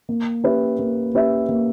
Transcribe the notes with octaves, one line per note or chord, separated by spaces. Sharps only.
A#3
C#4 G4 B4 E5
A#3
C#4 G4 B4 E5
A#3